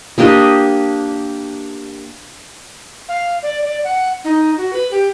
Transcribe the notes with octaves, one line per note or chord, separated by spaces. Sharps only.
A#3 D4 G4 D#5
F5
D5
D5
F#5
D#4
F#4
B4
G4